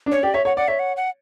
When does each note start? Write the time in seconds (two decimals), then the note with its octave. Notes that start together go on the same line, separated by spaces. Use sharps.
0.06 D4
0.12 C#4 C#5
0.23 G4 D5
0.34 C#5 E5
0.45 C#5 F#5
0.57 D5 F#5
0.68 C#5 E5
0.79 F#5
0.97 F#5